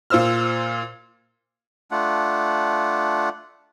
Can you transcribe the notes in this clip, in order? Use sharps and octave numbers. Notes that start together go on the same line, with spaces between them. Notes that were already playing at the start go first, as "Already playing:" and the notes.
A#2 F4 C5 E6 F6
A3 D4 F4 F#5